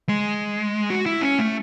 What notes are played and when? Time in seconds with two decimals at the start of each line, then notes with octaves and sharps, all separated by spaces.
0.09 G#3
0.90 F#4
1.06 E4
1.22 C#4
1.39 A3